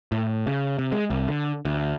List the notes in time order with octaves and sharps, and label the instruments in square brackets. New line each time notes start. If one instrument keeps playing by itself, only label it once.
[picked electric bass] A2
C#3
C3
G#3
C2
D3
D2